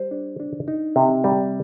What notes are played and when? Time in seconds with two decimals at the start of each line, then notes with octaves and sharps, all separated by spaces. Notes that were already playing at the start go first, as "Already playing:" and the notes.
Already playing: G3 C5
0.11 D4
0.40 D4
0.68 D#4
0.96 C3
1.24 G3